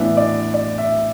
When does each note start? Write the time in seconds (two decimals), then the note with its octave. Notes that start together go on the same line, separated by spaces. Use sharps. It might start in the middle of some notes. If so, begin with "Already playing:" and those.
Already playing: A2 E3 B3 D4 E5
0.17 D5
0.54 D5
0.78 E5